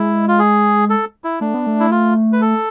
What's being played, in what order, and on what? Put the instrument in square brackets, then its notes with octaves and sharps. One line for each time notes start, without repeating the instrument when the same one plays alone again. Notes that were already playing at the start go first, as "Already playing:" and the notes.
Already playing: [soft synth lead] G#3 [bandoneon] E4
[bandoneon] F4
G#4
A4
E4
[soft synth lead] A3 [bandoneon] D4
[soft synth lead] B3
A3
[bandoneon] E4
F4
B4
A4